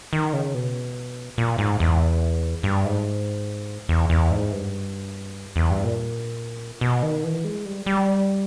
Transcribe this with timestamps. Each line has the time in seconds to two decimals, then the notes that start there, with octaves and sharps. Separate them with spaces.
0.13 D#3
0.33 C#3
0.54 B2
1.38 A#2
1.58 G#2
1.80 E2
2.63 G2
2.85 G#2
3.89 E2
4.10 E2
4.31 G#2
4.52 G2
5.56 E2
5.70 G2
5.84 A#2
6.81 B2
7.03 D#3
7.24 E3
7.44 G#3
7.65 G3
7.86 G3